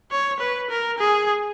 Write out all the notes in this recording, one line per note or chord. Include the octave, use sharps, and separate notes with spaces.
C#5
B4
A#4
G#4